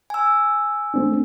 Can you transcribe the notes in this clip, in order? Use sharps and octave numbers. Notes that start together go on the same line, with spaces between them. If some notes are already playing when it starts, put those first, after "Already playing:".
G#5 E6
A3 C4 D4